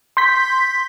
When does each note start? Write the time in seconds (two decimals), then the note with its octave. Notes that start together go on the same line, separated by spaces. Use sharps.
0.17 C6 G6 B6